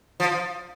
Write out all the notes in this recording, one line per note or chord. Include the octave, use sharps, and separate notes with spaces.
F3